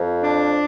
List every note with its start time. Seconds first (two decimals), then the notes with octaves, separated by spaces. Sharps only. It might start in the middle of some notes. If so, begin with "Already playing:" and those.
Already playing: F2
0.23 D4